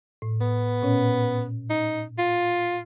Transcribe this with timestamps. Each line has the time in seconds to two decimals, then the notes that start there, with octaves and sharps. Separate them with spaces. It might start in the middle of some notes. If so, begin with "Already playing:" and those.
0.22 A2
0.41 B3
0.83 A#2 C#4 C#5
1.70 D#4
2.18 F4